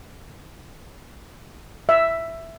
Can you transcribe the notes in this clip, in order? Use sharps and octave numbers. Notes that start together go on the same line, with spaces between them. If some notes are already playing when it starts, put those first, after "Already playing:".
E5